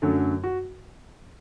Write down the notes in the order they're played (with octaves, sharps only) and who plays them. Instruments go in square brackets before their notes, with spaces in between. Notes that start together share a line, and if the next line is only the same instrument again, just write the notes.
[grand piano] F#2 D3 F#3 A3 A4
F#4